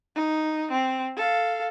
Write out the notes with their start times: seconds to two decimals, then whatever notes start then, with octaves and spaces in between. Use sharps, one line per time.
0.15 D#4
0.71 C4
1.16 A4 F5